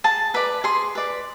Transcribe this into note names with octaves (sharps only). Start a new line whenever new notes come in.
G#4 A5
B4 D5 B5
G#4 C6
B4 D5